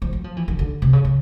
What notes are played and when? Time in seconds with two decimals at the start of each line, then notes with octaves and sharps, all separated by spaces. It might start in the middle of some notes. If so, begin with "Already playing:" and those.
0.02 F3
0.13 F#3
0.24 F3
0.37 E3
0.48 D#3
0.59 D3
0.82 C3
0.93 C#3
1.05 C#3